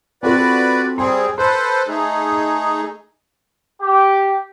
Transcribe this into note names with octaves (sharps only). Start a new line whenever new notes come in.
C4 F4 F#4 A4 B4 D5
G3 C4 G#4 C6
A4 B4 C5 C6
A3 D#4 G#4
G4